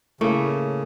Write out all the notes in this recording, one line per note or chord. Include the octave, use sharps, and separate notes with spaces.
A2 C#3 A3 A#3